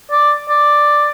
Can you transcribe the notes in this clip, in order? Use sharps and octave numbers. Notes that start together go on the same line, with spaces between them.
D5
D5